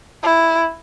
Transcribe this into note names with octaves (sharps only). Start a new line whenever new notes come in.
E4